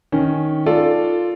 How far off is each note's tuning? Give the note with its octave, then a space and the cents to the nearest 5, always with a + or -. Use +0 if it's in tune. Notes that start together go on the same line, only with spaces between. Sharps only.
D#3 +0 C#4 +0
F4 +0 A4 +5 D5 +0